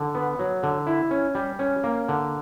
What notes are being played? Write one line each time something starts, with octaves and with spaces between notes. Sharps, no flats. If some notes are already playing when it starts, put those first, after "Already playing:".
Already playing: D3
B3
F#3
D3
E4
C#4
G3
C#4
A#3
D3